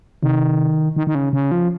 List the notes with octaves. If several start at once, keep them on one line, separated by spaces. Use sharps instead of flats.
C3 D#3
D#3
D#3
C#3
C#3
F3